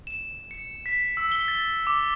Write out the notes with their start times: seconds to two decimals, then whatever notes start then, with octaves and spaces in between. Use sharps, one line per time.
0.07 E7
0.51 C#7
0.86 B6
1.17 E6
1.32 G7
1.48 A6
1.87 D6